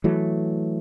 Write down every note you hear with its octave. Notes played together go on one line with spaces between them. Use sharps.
E3 F#3 A3